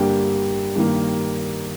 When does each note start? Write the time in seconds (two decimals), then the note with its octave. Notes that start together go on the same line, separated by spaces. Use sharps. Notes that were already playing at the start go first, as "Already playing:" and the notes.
Already playing: G2 D3 G3 A#3 G4 G5
0.76 G2 D#3 A#3